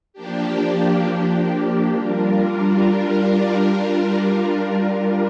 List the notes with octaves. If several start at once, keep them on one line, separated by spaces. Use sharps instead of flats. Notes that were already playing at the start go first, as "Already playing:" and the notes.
F3 A#3 D4 G4
G3 D4 F4 A#4